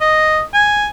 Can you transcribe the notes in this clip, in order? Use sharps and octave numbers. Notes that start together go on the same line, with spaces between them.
D#5
G#5